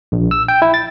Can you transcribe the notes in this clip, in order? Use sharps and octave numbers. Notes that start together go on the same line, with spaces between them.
A#1
E6
G5
E4
A6